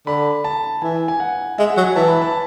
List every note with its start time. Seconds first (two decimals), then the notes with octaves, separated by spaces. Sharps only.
0.07 D3 B5
0.44 A5
0.82 E3 G#5
1.08 G#5
1.20 F#5
1.58 G#3 E5
1.70 F#5
1.77 F#3
1.83 G#5
1.96 E3 A5
2.08 B5
2.22 A5